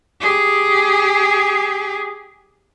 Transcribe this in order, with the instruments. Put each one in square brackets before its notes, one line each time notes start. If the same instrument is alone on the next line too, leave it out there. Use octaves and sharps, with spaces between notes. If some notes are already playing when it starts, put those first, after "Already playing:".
[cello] G4 G#4